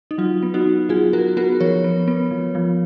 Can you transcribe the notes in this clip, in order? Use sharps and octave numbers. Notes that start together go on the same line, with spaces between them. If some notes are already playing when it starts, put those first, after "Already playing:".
D#4
F#3 F4
B3
D#4 F#4
B3
F#3 F4 G#4
F#3 F#4 A#4
B3 F#4 A#4
F3 A#4 C#5
B3
B3
F3
F3